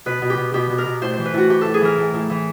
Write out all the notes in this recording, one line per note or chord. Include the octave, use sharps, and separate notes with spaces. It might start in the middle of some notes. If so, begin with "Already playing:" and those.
B2 B4
B2
G4
B2
B2 G4
B2
A#4
B2
A2 C5
E3 C5
B4
A2 F#4
A2 G4
A2 A4
G#4
E3 A#4
A2
A2
E3